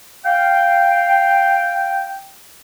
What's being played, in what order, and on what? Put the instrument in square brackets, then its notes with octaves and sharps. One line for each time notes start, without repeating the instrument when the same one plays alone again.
[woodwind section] F5 G5